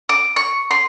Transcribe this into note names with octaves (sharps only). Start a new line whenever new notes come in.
D6
C#6
C6